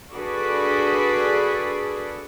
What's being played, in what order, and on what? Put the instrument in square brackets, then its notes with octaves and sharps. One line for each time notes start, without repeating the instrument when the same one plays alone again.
[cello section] D4 F#4 G#4 A4 B4 D5